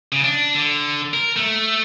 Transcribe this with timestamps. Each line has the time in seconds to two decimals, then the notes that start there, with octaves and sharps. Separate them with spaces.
0.12 C#3
0.24 D4
0.55 D3
1.14 A#4
1.36 A3